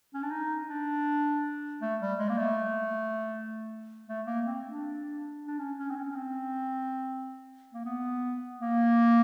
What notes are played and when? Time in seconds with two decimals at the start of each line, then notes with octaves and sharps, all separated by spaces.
0.14 C#4
0.22 D4
0.31 D#4
0.68 D4
1.81 A3
2.01 G3
2.19 G#3
2.29 A#3
2.38 A3
4.08 A3
4.26 A#3
4.46 C4
4.64 D4
5.47 D4
5.59 C#4
5.78 C#4
5.90 C4
5.96 C#4
6.11 C#4
6.15 C4
7.74 A#3
7.85 B3
8.60 A#3